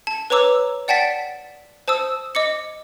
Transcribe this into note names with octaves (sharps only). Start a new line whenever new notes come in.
A5
B4 C#5 A#5 D6 E6
D5 F#5 G5 A5 A6 B6
C5 A5 D#6 E6
D#5 D6 C#7